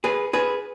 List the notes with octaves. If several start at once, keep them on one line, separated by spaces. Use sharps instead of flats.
G#4 B4
G#4 B4